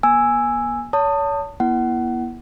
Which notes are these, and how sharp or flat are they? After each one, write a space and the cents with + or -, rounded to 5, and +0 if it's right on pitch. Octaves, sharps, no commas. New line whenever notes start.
A#3 +45 G#5 +0 E6 +0
C#5 +35 A5 +25 D#6 -15
B3 -45 E4 +0 F#5 +25